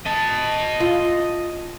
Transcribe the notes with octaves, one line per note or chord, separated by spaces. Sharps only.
D#5 A5
F4